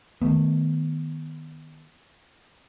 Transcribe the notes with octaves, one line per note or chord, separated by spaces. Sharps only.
D#3 E3 A3 B3